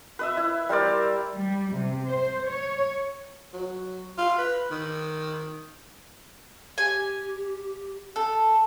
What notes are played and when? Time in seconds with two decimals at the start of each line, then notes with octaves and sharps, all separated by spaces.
0.19 B4 D#5 E5
0.37 E4
0.69 G3 A#4 C5 D5
1.34 G3
1.73 C3
2.08 C5
2.47 C#5
3.53 F#3
4.18 F4
4.38 B4
4.71 D#3
6.78 G4 G#5
8.16 A4